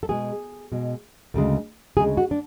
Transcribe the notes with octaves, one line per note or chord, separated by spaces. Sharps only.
A4
B2 G#3 G#4
B2 G#3
D2 C#3 G#3
D2 C#3 G#3 G#4
F#4
D4